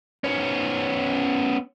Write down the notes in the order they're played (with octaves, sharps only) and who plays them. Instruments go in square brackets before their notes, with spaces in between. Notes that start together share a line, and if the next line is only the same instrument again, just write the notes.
[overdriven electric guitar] B3 C#4